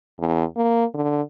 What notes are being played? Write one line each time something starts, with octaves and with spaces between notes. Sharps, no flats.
E2
A#3
D3